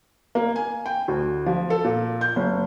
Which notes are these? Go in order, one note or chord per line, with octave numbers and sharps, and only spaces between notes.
A#3
G#5
G5
D2
F3
A4
A#2
G6
F#1